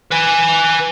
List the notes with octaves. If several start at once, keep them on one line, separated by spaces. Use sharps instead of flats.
B4 G#5